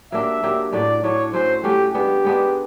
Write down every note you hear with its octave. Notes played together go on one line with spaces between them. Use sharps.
F#3 A#3 D4 G4 E5
F#3 A#3 D4 G4
A2 F#3 A3 D4 D5
A2 F#3 A3 D4 C#5
F#3 A3 C#4 F#4 C5
F#3 A3 C#4 F#4 G4
G#3 B3 D4 G4
G#3 B3 D4